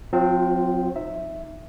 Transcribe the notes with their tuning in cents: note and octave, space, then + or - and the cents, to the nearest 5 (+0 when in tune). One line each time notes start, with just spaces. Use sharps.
F#3 -45 C4 -5 F4 +0
D#4 -5 E5 +0